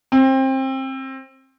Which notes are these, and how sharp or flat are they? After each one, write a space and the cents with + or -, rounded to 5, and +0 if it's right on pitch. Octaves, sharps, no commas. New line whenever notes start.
C4 +25